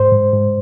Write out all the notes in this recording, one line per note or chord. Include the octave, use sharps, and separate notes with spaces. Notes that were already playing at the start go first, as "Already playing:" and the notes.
Already playing: G#2 C5
G#2
G#2